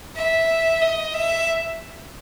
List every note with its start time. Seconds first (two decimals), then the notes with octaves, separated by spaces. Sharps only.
0.16 E5
0.81 D#5
1.14 E5